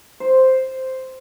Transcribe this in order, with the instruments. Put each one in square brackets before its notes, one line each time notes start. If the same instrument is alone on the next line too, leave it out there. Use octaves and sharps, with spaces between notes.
[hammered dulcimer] C5